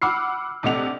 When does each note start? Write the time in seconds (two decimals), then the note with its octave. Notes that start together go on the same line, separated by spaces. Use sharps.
0.02 F#5 B5 D6 E6 F6 C7
0.63 A#1 C3 A3 D#5 F#5 F7